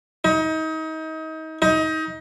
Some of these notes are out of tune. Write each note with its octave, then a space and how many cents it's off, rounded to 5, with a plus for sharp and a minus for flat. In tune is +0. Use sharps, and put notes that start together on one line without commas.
D#4 +30
D#4 +25